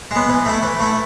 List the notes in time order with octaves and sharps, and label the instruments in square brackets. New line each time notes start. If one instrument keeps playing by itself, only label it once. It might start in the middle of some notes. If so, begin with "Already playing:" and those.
[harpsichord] G#3 B3
E3
A3 E4
E3
A3 E4